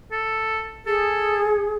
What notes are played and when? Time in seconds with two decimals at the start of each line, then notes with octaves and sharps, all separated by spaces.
0.12 A4
0.86 G#4 A4